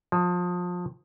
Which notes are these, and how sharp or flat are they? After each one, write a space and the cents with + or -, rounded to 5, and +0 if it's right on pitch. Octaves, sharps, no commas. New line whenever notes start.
F3 +30